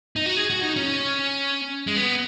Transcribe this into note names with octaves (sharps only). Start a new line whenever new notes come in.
D#4
F#4
G#4
F#4
D#4
C#4
G#3
B3